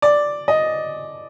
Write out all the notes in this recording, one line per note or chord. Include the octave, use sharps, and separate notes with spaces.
D5
D#5